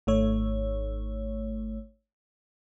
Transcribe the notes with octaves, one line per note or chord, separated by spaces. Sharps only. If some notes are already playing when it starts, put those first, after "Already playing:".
G#1 A3 C#5